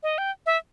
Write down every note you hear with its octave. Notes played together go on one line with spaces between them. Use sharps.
D#5
G5
E5